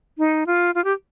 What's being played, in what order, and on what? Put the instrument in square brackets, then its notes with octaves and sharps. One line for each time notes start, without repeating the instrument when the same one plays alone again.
[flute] D#4
F4
F4
G4